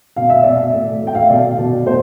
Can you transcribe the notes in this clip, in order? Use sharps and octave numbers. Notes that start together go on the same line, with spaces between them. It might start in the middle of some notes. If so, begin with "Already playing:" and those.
B2 F5
E5
B2 D5
E5
A2
A2
G5
F5
E5
B2 D5
B2
A2 C5